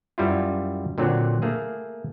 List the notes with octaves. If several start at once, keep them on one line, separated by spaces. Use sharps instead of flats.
F#2 G3 E4 F4
A#2 D3 F#3 C4
A3 A#3 G#4